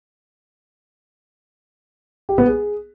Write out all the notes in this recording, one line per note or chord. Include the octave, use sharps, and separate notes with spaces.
G4
B3
G#4